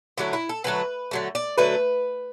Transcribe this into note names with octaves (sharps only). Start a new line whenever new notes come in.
D3 F#3 A3 E4
E4
A4
D3 F#3 A3 B4
D3 F#3 A3
D5
D3 F#3 A3 B4